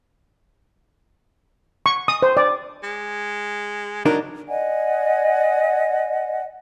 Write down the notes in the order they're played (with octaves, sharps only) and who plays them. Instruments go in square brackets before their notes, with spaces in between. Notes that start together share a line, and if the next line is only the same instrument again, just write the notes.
[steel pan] C#6
D#6
C5
D5
[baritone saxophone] G#3
[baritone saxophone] F#3 [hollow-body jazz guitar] D4 D#4 A#4
[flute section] D5 D#5 F#5 G#5